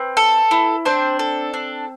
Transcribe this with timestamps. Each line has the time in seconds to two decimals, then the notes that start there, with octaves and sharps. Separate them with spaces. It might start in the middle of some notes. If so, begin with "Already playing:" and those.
Already playing: C4 B4
0.17 A4
0.51 E4
0.85 C4 D4 C5
1.19 A4
1.54 D4